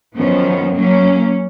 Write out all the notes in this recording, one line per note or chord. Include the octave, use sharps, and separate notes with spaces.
F#2 D#3 F3 B3 C#4
F#3 A#3 C#4